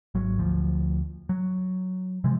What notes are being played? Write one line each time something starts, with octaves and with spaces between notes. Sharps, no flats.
G#1 F#3
D2 F3
F#3
C3 E3 F3 G#3